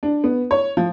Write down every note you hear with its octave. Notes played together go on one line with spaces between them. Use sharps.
D4
B3
C#5
F3